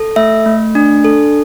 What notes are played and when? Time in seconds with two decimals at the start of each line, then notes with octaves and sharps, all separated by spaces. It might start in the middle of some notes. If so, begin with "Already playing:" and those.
Already playing: A4
0.16 A3 E5
0.46 A3
0.75 D4
1.05 A4